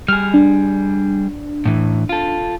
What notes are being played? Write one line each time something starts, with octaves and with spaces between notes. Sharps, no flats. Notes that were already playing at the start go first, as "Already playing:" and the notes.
G3 G#4 F6
D4
A2 E3
F4 A4